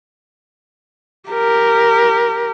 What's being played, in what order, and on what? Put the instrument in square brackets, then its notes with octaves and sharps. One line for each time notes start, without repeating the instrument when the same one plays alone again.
[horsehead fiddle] G4 A#4